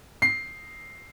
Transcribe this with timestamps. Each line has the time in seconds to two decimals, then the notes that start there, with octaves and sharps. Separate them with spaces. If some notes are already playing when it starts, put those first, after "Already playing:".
0.22 C7